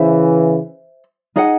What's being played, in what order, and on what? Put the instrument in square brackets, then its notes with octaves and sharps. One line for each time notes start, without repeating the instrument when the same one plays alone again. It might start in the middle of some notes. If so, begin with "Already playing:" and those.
Already playing: [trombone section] C#3 E3 [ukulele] C5 E5
[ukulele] D#4 G#4 D#5 F#5